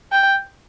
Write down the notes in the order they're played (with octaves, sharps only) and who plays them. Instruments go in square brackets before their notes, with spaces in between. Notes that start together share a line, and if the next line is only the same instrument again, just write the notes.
[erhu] G5